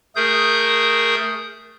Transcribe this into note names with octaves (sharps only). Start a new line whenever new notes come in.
A3 G#4 A#4 D#6 G6